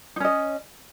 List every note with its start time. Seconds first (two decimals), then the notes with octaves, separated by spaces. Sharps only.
0.16 D#4
0.20 C#4
0.25 D#5